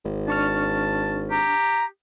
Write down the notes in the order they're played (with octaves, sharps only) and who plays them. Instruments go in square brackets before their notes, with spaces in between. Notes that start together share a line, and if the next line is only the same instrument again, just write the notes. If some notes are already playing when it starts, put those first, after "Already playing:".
[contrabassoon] G#1
[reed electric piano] D4 C#6 F6 [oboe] A5
[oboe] G4 [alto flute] A#5